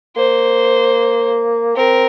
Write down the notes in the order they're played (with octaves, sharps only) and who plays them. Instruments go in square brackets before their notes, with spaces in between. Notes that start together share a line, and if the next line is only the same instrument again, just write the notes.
[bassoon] A#3 [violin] C5
[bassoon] C4 [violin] A#4